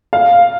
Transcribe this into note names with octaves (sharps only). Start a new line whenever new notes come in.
F5